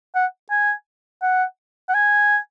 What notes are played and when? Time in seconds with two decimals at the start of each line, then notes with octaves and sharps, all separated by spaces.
0.15 F#5
0.51 G#5
1.22 F#5
1.89 F#5
1.94 G#5